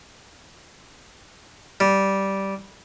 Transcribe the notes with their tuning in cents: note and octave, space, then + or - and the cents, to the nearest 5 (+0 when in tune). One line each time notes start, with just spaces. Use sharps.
G3 -10